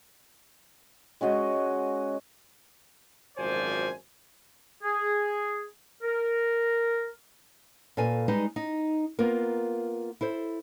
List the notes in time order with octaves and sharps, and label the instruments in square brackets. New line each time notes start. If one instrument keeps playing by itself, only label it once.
[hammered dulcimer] G#3 C#4 F#4 D#5
[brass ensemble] G#1 F#2 F3 C5 D5 G#5
[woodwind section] G#4
A#4
[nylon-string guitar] A#2 A4 B4 F5 G#5
G3 G#3 D#4 B4
D#4
A#3 B3 F4 A#4
E4 A4 C5